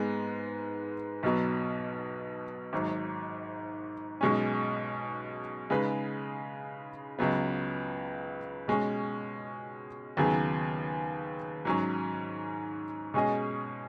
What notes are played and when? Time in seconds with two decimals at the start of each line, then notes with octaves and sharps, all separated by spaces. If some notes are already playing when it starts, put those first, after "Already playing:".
Already playing: G#2 G#3 B3
1.23 B1 B2 F#3 B3
2.73 G#1 G#2 F#3
4.21 B1 B2 G#3 C#4
5.70 C#3 G#3 D#4 B4
7.19 C#2 C#3 F#3 B3
8.68 B2 G#3 C#4
10.17 D#2 C#3 F#3 B3 G#4
11.65 G#2 F#3 C#4
13.14 B2 G#3 C#4 G#4 D#5